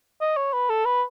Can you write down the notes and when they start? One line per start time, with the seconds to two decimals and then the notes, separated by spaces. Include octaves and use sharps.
0.21 D#5
0.37 C#5
0.53 B4
0.69 A4
0.85 B4